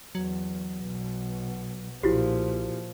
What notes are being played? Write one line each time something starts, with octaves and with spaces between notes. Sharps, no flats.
E2 F#3
B1 B2
B1 A#2 F3 E4 F#4 G4